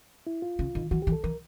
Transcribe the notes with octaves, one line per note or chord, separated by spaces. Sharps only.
E4
F4
C#3
D#3
E3 F#4
G4
E3
A4
E3 A#4